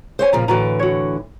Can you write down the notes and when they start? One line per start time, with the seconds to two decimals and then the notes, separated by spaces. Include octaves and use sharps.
0.19 C5 C#5 G#5
0.33 A#2 C#3 F3 A#5
0.48 A2 D3 E3 F#4 B4 A#5
0.80 F#4 C#5